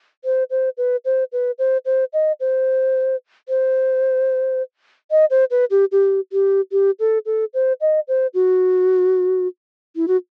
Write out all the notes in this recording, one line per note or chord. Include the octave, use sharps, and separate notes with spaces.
C5
C5
B4
C5
B4
C5
C5
D#5
C5
C5
D#5
C5
B4
G4
G4
G4
G4
A4
A4
C5
D#5
C5
F#4
E4
F#4